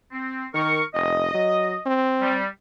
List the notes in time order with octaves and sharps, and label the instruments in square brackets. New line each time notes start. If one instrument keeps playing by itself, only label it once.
[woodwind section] C4
[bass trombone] D#3 [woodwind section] A#4 C#6
[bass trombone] F1 [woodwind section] D#5
[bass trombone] F#3
C4
[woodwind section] G3